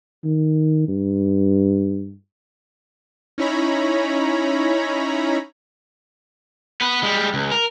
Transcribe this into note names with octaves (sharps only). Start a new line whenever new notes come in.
D#3
G2
C#4 D#4 E4 C#5 A#5 B5
B3 B4
G3 G#3
C#2
A#4